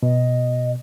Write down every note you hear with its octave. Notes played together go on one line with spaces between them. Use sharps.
B2 D#5